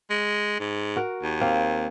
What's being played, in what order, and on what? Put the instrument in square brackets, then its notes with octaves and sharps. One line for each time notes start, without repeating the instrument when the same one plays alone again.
[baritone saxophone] G#3
G#2
[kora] F#4 A#4
[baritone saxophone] D#2
[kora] A#3 C4 F5